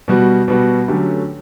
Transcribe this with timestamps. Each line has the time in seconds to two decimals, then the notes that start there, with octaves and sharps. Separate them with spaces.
0.08 B2 G3 B3 F#4
0.48 B2 G3 B3 F#4
0.88 D3 F#3 A3 C#4 G4